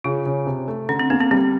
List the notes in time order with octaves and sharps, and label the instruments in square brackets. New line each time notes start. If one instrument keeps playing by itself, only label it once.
[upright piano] C#3 [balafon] F4
[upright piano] C#3
C3
A3
[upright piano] D3 [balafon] C#4
[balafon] C4
[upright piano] A#3 [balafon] B3
[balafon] C4
[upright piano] G3 [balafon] C4